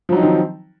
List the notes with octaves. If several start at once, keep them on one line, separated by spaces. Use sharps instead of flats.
D#3 F3 F#3 C4 D#4